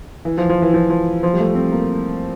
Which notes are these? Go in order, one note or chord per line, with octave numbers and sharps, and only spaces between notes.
E3
F3
F3
E3
F3
F3
F3
G3
A3
C4
A#3